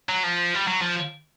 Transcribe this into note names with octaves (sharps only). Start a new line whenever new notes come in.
F#3
F3
G3
F#3
F3